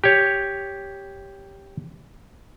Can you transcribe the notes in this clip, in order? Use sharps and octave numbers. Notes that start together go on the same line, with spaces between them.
G4 C#5